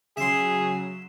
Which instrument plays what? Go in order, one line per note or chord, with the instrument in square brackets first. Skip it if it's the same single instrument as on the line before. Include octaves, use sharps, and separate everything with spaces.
[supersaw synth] C#3 F#3 [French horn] G#4 [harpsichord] E5 C6